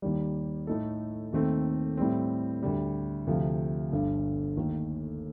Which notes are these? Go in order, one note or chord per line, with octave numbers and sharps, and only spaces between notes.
D#2 D#3 G3
A2 A3 D#4 A4
D#2 D#3 A3 C4
A2 G3 C4
D2 D3 G3
D2 C3 F3
G1 G2 D3
D#2 D#3 A3